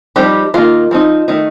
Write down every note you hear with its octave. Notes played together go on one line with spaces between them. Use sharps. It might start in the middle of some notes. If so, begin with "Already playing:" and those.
F3 G3 C4 D#4 G4
D#3 A#3 D#4 F4
F3 C4 D#4
D#3 A3 D#4